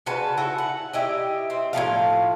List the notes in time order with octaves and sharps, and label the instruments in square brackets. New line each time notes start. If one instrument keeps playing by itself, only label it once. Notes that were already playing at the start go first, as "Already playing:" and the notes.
[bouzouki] C#3 F#4 B4 A5
E4 F#4 A4
F#5
E4 G4 D#5
C4
A2 C#3 F3 F5